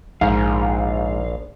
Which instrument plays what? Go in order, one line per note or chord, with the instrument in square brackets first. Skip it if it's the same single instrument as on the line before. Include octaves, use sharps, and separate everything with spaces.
[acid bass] A#1 [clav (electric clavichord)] G#2 [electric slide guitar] F5